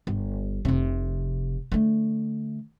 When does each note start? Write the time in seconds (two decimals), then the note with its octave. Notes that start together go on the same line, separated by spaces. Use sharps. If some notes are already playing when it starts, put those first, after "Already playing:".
0.07 G1
0.65 F1 C3
1.72 D3 A3